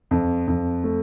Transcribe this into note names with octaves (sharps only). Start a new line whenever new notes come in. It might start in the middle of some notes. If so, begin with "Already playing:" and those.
F2
F2
A3